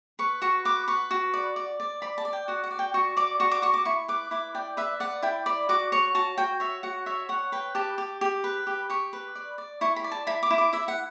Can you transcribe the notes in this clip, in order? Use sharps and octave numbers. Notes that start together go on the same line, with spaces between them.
B4 C#6
F#4 C#6
B4 D6
B4 C#6
F#4
D5
D5
D5
D5 B5
A5
D5
G5
F#4 F#5
F#5
D5
G5
F#4 C#6
D5 D6
F#4 C#6
D6
F#4 C#6
D6
E4 C#6
B4 D6
E4 D6
D5 G5
B4 E5
D5 F#5
E4 G5
D5 B5
F#4 D6
C#5 C#6
F#4 A5
F#4 G5
C#5 E5
F#4 F#5
C#5 E5
C#5 F#5
B4 G5
G4 A5
G4
G4
B4
G4
G4 C#6
B4
D5
D5
E4 C#6
B5
D5
A5
E4 B5
D6
E4
D6
E4 E5
F#5